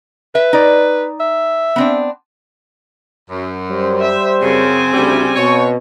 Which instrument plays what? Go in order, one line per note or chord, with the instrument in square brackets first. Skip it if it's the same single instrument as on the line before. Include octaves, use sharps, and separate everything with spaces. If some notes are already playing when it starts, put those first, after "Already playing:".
[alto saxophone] B4 [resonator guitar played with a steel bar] E5
[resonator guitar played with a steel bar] D#4 D5
[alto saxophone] E5
[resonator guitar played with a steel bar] B3 C4 D4
[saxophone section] F#2
[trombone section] G3 C5
[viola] E5
[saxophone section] F#2 C#3 [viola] C4 G#5
[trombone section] D2 [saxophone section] C#3 G3
[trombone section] B2 [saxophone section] C#5